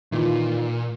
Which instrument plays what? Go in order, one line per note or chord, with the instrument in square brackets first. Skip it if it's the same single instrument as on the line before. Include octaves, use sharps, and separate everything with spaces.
[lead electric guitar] A#2 [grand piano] D#3 E3 F4